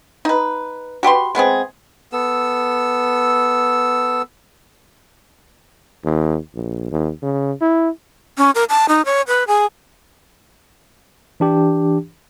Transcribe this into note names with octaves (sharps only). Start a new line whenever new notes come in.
D#4 B4
F#4 G4 B4 C6
G#3 B3 C4 G#4
B3 A4 E6
D#2
A#1
D#2
C#3
E4
C#4
A#4
A5
D#4
C#5
B4
G#4
E3 D4 G4